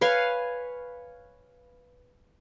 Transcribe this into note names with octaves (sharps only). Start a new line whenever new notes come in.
B4 C#5 F5 G#5